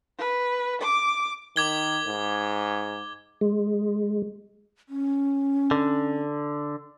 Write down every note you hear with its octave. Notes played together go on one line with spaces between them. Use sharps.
B4
D6
D#3 D6 G#6 G7
G#2
G#3
C#4
D3